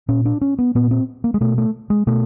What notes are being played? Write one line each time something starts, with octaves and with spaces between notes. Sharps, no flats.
A#2 C#4
D4
C#4
B3
A#2 B3
C4
A#3
G#3
B2 A3
A3
G#3
B2 A3